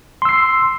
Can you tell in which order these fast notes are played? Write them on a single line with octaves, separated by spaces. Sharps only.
C6 E6 C7